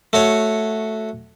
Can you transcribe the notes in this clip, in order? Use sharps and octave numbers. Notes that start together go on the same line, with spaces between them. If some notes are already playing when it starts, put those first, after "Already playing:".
A3 F#4 C#5